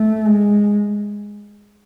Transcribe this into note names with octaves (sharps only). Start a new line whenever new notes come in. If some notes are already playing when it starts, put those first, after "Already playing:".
Already playing: A3
G#3